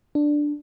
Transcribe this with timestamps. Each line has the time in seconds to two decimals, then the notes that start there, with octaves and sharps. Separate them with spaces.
0.15 D4